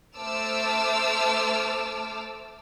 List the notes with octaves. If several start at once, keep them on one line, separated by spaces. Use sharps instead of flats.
A3 C5 A5 D6 E6 F6